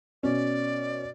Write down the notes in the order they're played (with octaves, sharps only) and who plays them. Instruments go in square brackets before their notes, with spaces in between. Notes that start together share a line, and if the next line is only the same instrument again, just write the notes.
[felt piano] B2 C#4 [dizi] D5